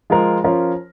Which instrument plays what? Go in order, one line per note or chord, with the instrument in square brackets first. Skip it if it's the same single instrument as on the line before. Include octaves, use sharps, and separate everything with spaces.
[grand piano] F3 G#3 F4 A#4
F3 C#4 F4 A#4